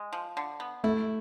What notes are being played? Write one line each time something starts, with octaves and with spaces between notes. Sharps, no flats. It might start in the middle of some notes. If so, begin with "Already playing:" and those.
Already playing: G#3
F3
D3
B3
A3 E4